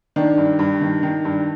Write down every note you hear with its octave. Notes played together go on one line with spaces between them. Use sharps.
D#3 D4
G2
G2
D#3
D#3
G2